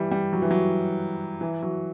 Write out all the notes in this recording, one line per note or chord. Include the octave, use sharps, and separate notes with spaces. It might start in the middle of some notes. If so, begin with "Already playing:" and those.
Already playing: E3 G3
G3
F#3
E3
F#3
E3
F#3